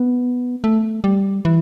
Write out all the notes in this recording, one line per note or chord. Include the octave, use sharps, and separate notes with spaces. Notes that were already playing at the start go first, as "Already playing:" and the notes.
Already playing: B3
A3
G3
E3